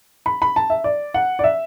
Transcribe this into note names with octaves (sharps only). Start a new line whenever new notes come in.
B5
B5
A5
E5
D5
F#5
D5
E5